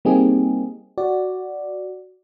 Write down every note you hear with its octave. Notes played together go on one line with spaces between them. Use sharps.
G3 A#3 C4 D#4 G4 G#4
F#4 D5